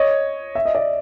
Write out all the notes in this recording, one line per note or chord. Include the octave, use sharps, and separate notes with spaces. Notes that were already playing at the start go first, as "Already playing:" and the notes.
Already playing: C#5 D#5
E5
D#5
D5 E5